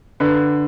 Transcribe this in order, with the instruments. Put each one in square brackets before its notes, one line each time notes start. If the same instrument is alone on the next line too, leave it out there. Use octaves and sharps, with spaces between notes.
[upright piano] D3 B4